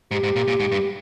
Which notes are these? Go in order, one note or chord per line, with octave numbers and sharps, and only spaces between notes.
G#2 G4
G#2
A#2
A#2
G#2
G2